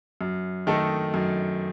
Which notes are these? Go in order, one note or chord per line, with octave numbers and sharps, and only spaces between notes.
F#2
D#3 A3 D#4 A4
F#2